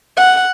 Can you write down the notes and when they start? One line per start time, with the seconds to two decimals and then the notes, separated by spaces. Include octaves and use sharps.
0.17 F#5